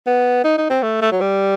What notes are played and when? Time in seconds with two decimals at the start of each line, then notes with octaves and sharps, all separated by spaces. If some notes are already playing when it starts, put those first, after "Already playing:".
0.07 B3
0.44 D#4
0.58 D#4
0.70 C4
0.82 A3
1.02 A3
1.12 F#3
1.21 G3